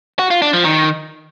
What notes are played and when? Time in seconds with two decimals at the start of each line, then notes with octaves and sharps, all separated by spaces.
0.19 F#4
0.31 F4
0.42 D4
0.53 F3
0.65 D#3